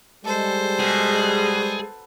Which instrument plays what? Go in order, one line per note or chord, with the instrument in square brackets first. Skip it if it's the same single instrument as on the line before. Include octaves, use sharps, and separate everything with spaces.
[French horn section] G3 G#3 [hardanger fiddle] A4 C5
[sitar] B2 [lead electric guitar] G#4